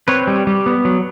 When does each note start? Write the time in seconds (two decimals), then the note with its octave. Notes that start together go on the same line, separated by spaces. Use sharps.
0.08 C4 B4 C#5
0.27 G3
0.47 G3
0.66 B3
0.85 F#3